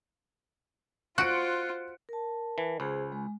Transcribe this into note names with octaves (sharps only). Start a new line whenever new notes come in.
F4 F#4 C5 F#6 C#7 D7
A#4 A5
E3
C#2 G#4 C5
G#3